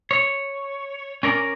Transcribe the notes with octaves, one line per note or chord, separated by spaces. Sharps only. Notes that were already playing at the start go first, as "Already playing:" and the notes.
C#5
C#4 A#4 D5